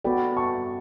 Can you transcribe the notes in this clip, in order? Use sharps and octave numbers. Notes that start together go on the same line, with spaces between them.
B3 F#4 A4 D5 G5 B5
A5 C#6